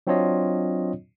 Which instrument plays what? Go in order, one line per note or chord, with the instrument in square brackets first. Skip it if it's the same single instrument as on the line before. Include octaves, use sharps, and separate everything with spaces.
[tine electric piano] F#3 C4 D4 F4 C#5 D#5